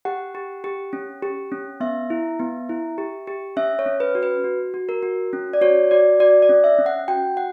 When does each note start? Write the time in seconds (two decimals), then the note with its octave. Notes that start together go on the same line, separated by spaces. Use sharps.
0.05 G4 F#5
0.35 G4
0.64 G4
0.93 C#4
1.23 G4
1.52 C#4
1.80 B3 E5
2.10 E4
2.39 B3
2.69 E4
2.98 G4
3.27 G4
3.57 C#4 E5
3.79 C#5
3.86 C#4
4.00 B4
4.15 F#4
4.23 B4
4.44 F#4
4.74 F#4
4.89 A#4
5.03 F#4
5.33 C#4
5.53 D5
5.61 F#4 C#5
5.91 F#4 D5
6.20 F#4 D5
6.42 D5
6.49 C#4
6.64 E5
6.78 C#4
6.86 F#5
7.08 F#4 G5
7.37 F#5